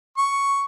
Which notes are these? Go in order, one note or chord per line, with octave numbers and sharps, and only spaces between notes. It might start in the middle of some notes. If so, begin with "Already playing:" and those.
C#6